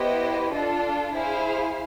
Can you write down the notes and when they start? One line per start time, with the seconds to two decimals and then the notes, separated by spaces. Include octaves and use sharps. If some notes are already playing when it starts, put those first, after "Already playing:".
Already playing: B3 E4 G4 C5 D#5
0.49 D4 F4 A4
1.13 E4 G#4 C5 F5